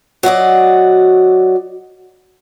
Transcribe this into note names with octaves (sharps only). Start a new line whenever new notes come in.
F#3 F#4 D5 D#5